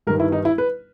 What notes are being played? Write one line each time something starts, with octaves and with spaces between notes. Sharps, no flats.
G1 G2 D#3 A#4
E4
D#4
E4
B4